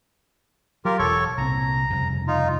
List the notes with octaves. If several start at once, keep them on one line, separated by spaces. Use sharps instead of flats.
F#3 F4 G4 A#4
E1 A4 C#5 C#6
C2 A#2 C4 A#5
F1 G2 C#3
D#4 F4